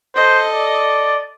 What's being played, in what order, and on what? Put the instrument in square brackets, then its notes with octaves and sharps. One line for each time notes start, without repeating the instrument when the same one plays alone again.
[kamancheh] A4 D#5 [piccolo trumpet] C5
[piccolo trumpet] D5